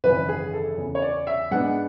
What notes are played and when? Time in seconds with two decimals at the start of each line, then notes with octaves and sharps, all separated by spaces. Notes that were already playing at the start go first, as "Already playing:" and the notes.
0.04 G#1 F#2 C#3 E3 B4
0.29 G#4
0.53 A4
0.77 E2 C#3 E3
0.95 C#5
1.02 D5
1.27 E5
1.51 G#2 G#3 B3 D4 F#5